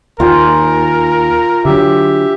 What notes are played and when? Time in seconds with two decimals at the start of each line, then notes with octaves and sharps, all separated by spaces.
0.20 D#2 F4 A#4 C5 G#5
1.65 D3 F#3 G4 E5